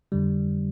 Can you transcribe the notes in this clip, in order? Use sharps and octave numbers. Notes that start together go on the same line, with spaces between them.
F2 D3 G3